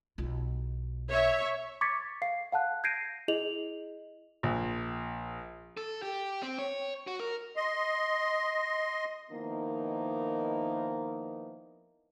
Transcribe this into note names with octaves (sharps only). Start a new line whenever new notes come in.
B1 F4
C#5 E5
C#6 D6 G#6 A6 B6 C#7
F5 C7
F5 F#5 A5 F#6
G6 G#6 A#6 C7 D7 D#7
E4 G#4 D#5 F7 F#7
A#1
A4
G4
C4
C#5
F#4
A#4
D#5 C6
D#3 F3 A#3 B3 D#4 E4